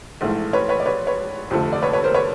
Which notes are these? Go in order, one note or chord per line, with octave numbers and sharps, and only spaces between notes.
A#1 G#2 E3 A3
B4 C#5
B4 C#5
D5
B4 C#5
B4 C#5
F1 F2 D3 F3 A3
D5
B4 C#5
B4 C#5
A#4 C5
B4 C#5